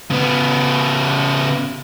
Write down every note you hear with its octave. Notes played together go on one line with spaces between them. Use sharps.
C#3 B3